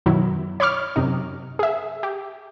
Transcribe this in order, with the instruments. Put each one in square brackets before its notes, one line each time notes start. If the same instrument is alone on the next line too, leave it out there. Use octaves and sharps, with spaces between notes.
[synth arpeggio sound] F#2 B2 D#3 F#3 E4
C#5 B5 C#6 D6 F6
F#2 C3 D#4
G#4 E5
G4